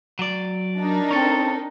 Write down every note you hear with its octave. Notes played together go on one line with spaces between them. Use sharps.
F#3 D5
D4 D#4 A#4
C4 C#4 A4